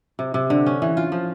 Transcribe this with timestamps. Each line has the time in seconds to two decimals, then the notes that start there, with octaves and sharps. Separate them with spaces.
0.19 C3
0.34 C3
0.50 D3
0.66 C#4
0.82 E3
0.97 F4
1.12 F3